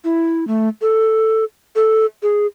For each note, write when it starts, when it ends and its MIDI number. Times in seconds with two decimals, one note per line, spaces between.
0.04 0.47 64
0.47 0.69 57
0.81 1.44 69
1.76 2.06 69
2.23 2.46 68